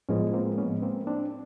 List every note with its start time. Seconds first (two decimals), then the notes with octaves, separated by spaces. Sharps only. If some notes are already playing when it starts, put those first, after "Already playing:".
0.09 A2 F3 G#3 B3 C#4
0.34 A#3 C4
0.58 B3 C#4
0.82 A#3 C4
1.07 C4 D4